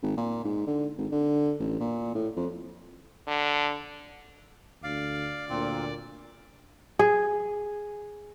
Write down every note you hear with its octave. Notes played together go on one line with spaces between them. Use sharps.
G#1
A#2
G#2
D3
G#1
D3
A1
A#2
A2
F2
D3
D2 D5 F5
D2 A#2 C4 F4
G#4